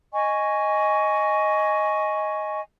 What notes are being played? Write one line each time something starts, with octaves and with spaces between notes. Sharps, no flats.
D#5 G#5 C#6